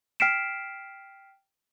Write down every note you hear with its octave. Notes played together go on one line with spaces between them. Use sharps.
G5 F6 B6 C7 D7 E7